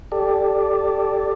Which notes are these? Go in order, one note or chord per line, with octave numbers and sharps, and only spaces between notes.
G4 A4 D5